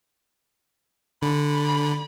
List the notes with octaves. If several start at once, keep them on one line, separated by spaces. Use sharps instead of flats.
D3 B5